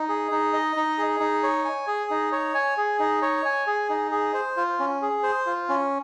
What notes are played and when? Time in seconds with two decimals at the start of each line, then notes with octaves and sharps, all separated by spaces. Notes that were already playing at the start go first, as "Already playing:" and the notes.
Already playing: D#4
0.09 G#4
0.31 D#4
0.53 D#5
0.76 D#4
0.98 G#4
1.20 D#4
1.43 C#5
1.65 G#5
1.87 G#4
2.10 D#4
2.32 C#5
2.55 G#5
2.77 G#4
2.99 D#4
3.22 C#5
3.45 G#5
3.67 G#4
3.90 D#4
4.11 G#4
4.34 C5
4.57 F4
4.80 C#4
5.02 G#4
5.23 C5
5.46 F4
5.69 C#4